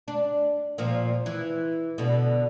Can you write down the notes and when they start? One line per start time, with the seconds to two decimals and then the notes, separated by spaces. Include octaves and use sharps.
0.08 D4
0.78 A#2 F3
1.26 E3
1.98 B2 D3